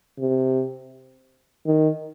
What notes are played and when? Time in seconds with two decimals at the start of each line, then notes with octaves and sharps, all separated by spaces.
0.19 C3
1.67 D#3